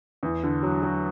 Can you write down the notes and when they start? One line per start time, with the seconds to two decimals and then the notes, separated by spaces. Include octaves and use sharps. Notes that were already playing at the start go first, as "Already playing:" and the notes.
0.23 E2
0.43 D3
0.63 F#3
0.83 F#3